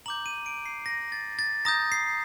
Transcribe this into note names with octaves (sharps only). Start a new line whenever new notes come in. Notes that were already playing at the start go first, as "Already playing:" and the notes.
A#5 D6 G6 F#7
D#7
D7
C7
A#6
A6
A6
A#5 D#6 G6 A#6
C7